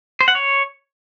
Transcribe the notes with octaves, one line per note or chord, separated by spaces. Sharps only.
C5
F#5
C#5